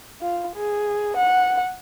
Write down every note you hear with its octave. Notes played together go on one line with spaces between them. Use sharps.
F4
G#4
F#5